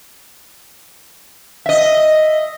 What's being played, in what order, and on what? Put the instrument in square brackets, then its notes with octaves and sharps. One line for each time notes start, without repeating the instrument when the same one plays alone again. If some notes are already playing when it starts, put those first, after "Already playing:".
[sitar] D#5 E5